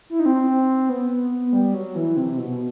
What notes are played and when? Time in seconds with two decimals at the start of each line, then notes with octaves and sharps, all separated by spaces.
0.10 E4
0.20 D#4
0.26 C4
0.89 B3
1.53 G3
1.74 F#3
1.95 E3
2.17 C3
2.37 B2